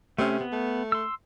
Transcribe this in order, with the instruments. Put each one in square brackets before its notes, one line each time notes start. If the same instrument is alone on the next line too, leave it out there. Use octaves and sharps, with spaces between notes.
[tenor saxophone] C3 [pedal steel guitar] A3 C#4
[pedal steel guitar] B3
[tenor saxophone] A3
[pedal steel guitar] C6 E6